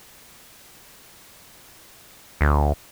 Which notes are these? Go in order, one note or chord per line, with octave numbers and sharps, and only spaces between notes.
D2